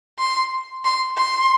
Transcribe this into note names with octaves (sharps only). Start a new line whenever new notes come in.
C6
C6
C6